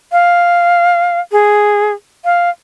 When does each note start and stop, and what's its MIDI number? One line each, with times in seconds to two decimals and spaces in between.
0.12 1.20 77
1.32 1.92 68
2.25 2.50 77